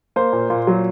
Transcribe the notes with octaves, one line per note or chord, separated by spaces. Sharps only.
A#3 C5
A#2
A#2
F#3